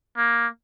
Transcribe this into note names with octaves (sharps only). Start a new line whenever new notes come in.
A#3